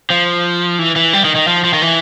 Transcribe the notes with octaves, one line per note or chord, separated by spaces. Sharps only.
F3
E3
E3
G3
D#3
D#3
F3
F3
D#3
E3